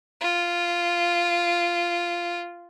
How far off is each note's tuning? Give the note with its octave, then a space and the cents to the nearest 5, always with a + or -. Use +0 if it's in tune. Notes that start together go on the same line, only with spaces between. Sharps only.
F4 -10